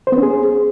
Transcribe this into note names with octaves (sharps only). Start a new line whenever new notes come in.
C5
B3
C#4
G#4